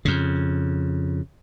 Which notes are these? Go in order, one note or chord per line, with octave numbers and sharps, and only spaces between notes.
F2 C#3